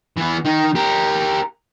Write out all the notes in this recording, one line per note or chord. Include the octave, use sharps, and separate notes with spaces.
E3 B3
D#3 D#4
G4 A#4